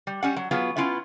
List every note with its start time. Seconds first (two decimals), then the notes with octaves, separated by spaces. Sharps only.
0.07 G3
0.23 G3 C#4 F#5
0.36 F#3
0.51 F#3 B3 F4 G#4
0.77 B3 C#4 E4 F4